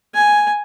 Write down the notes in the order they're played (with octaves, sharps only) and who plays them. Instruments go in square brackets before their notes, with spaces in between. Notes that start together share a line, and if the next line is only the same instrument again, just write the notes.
[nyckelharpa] G#5